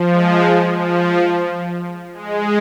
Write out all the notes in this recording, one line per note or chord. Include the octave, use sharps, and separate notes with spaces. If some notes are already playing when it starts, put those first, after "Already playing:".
Already playing: F3
G#3
F3
G#3